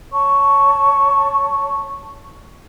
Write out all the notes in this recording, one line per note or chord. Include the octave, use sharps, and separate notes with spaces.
C#5 A5 C#6